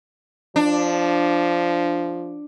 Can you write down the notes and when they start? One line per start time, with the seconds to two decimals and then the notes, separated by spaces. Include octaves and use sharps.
0.56 F3 D4